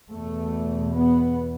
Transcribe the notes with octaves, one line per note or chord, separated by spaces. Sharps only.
E2 B2 A3
B3